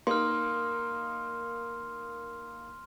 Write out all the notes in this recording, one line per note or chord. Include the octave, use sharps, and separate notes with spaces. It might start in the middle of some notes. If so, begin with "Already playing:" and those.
A#3 D#4 C6 F6